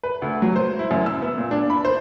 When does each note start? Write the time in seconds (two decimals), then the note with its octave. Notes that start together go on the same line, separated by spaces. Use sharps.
0.03 B4
0.22 D2
0.42 F#3
0.56 C5
0.79 E4
0.91 F#2
1.06 E6
1.22 B3
1.37 A#2
1.51 D4
1.70 B5
1.85 C5